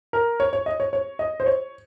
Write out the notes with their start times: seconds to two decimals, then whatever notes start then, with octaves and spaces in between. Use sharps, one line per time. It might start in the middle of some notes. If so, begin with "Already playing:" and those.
0.13 A#4
0.40 C#5
0.53 C#5
0.66 D#5
0.80 C#5
0.93 C#5
1.19 D#5
1.40 C5
1.46 C#5